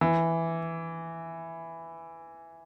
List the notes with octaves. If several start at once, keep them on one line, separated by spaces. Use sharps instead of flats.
E3